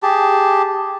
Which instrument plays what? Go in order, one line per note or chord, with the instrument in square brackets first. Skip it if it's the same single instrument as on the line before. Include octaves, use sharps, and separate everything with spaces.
[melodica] G4 G#4 A5